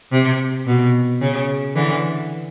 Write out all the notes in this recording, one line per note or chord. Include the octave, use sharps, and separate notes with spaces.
C3
B2
C#3
D3 E3